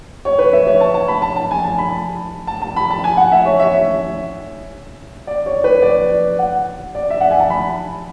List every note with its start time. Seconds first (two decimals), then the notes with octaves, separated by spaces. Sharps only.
0.25 C#5
0.38 B4
0.53 E5
0.67 C#5
0.80 A5
0.94 A5
1.08 B5
1.22 A5
1.36 A5
1.51 G#5
1.64 A5
1.78 B5
2.47 A5
2.62 A5
2.76 B5
2.90 A5
3.04 G#5
3.17 F#5
3.32 E5
3.46 C#5
3.60 E5
5.27 D5
5.46 C#5
5.64 B4
5.82 D5
6.39 F#5
6.95 D5
7.10 E5
7.20 F#5
7.31 G#5
7.40 A5
7.50 B5